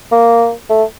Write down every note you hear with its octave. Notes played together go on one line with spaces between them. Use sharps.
A#3
A3